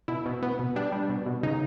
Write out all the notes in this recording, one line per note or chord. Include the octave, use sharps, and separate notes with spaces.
B2 E4
B2
B3
B2
G3 D4
G3
B2
B2
C#3 D#4